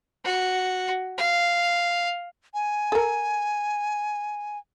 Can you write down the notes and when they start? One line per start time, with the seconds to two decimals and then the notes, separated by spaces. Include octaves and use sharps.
0.25 F#4
1.18 F5
2.54 G#5
2.92 A4 A#4